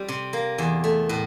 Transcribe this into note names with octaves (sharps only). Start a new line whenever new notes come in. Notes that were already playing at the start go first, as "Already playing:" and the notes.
Already playing: G3 C4
C3
A#3
E2
A3
A2